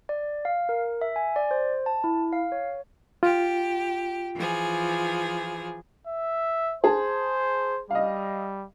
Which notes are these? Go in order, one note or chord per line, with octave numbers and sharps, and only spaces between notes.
D5
F5
A#4
E5
G#5
D5
C5
A5
E4
F5
C#5
F4 G4
E3 F3 G#4
E5
G#4 C5 A5
G3 D#5 F5